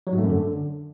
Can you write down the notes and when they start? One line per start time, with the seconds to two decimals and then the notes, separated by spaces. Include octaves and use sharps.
0.07 F#3
0.12 G#2
0.18 A3
0.23 F#2
0.29 D3